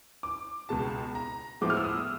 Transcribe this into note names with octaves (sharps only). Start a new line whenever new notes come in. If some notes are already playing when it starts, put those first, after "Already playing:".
D6
C#2 B2 G#3 A5
A#5
A2 F3 G#3 B3 D6
F6
E6
D#6